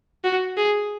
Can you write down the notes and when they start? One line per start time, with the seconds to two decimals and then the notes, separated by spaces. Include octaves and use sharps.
0.25 F#4
0.57 G#4